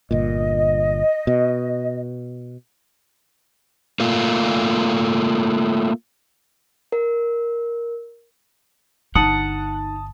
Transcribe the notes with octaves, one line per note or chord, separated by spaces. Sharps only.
G1 A#2 D#5
B2
A3 A#3 F4
A#4
G1 D3 D#4 F#5 A5 D#6